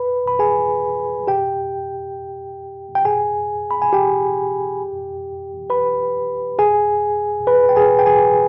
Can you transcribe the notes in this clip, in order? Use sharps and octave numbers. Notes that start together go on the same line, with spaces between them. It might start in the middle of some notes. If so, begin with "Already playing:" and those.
Already playing: B4 B5
B5
G#4 G#5
G4 G5
G5
G#4 G#5
B5
G#5
G4 G5
B4 B5
G#4 G#5
B4 B5
G5
G#4 G#5
G5
G#4 G#5